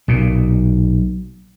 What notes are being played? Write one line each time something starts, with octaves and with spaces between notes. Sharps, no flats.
B1 A#2